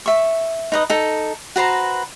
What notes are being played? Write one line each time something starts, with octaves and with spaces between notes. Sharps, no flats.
E5 C#6
D#4 B4 D#5
D#4 A4
F#4 B4 C5 A#5